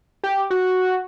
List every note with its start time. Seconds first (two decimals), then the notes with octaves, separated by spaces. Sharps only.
0.24 G4
0.50 F#4